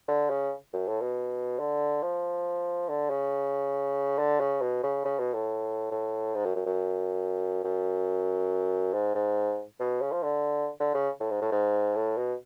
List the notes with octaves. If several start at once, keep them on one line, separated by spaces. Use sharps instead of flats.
D3
C#3
F#2
A2
B2
D3
F3
D3
C#3
D3
C#3
B2
C#3
C#3
B2
A2
A2
G#2
F#2
F#2
F#2
F#2
G#2
G#2
B2
C#3
F3
D3
D3
C#3
A2
G#2
A2
G#2
A2
B2